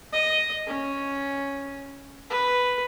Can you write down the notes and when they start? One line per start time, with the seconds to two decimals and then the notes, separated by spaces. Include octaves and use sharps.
0.13 D#5
0.67 C#4
2.30 B4